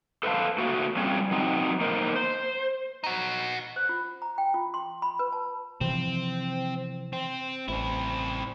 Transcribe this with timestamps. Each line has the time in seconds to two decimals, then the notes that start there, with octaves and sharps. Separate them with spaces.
0.23 A4 B4 C5 D#5 F5 A5
0.58 A3 A#3 F#4
0.97 G3 C4 C#4 F4 G#4 C#5
1.31 F#3 C4 D#4
1.81 A#3 D#4 A#4 C5
2.15 C5
3.04 D#4 F#4
3.76 C5
3.89 F4
4.22 A#5
4.38 G5
4.54 F4
4.74 C6
5.02 B5
5.19 B4
5.33 A5
5.81 C3 E3 F3 C4
7.13 C4
7.68 A1 C4 E4